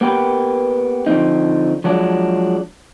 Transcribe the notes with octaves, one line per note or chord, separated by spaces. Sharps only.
A#3 B3 G4 B4
D3 F3 A#3 C4 D#4
F3 F#3 G#3 D4